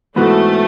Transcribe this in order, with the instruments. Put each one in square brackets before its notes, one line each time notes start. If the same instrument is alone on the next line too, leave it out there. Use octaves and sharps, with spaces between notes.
[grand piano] G#2 E3 B3 F#4 [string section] A3